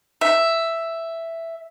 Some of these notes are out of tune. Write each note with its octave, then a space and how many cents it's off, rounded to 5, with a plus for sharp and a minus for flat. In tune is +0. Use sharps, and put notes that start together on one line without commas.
E5 +5